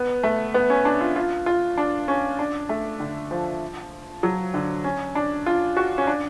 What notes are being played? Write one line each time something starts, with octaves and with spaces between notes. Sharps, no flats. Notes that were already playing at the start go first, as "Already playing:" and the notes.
Already playing: B3
A3
B3
C#4
D4
F4
F4
F4
D4
C#4
D4
A3
D3
F3
F#3
D3
C#4
D4
F4
F#4
C#4
D4